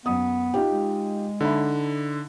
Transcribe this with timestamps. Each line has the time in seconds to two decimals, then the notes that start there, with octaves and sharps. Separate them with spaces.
0.06 F#2 B3 D#6
0.54 D#4 F4 G4
0.72 G#3
1.41 D3 D#4 E5 B5